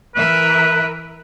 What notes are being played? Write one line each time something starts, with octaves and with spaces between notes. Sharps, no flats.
E3 A#4 B4 E5